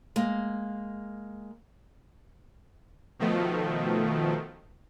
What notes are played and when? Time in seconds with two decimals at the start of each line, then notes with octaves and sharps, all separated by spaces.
0.16 G#3 A#3
3.19 B2 D#3 F3 A3